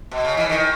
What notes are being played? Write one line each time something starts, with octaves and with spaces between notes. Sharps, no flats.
B2
C#3
E3
D#3